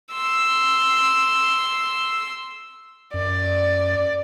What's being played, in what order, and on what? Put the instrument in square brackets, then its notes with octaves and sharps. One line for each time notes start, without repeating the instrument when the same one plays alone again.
[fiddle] C6 E6
[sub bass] F#2 [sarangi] D5